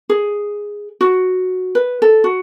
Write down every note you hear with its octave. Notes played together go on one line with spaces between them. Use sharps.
G#4
F#4
B4
A4
F#4